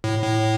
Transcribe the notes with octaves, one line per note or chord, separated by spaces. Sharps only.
A2
A2